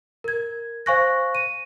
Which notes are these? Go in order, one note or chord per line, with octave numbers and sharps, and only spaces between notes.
A#4 G#6
C5 F5 G#5 C#6 F#6 A#6
D#7